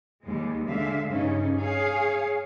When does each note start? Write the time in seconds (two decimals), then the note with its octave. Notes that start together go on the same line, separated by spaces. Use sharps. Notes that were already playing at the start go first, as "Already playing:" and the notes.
0.23 D#2 G3 G#3
0.68 D3 G#3 E5 F5
1.10 G2 C#3 C#4 D#4
1.56 G#4 C#5 F5